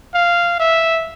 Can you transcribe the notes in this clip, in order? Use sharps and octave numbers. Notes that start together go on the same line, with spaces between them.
F5
E5